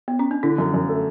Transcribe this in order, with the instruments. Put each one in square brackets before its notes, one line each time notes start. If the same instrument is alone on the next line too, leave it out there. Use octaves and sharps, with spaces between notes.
[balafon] B3
C#4
D4
[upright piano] D3 [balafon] E4
[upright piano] F#2
F#2
A3